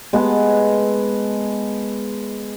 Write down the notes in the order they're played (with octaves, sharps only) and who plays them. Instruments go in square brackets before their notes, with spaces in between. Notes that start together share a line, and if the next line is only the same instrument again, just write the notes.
[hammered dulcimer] G#3 B3 A5